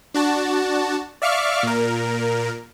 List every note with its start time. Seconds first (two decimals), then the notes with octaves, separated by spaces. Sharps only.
0.14 D4 F#4 A5
1.22 D5 E5 F5 C#6 D6 F6
1.63 A#2 A#4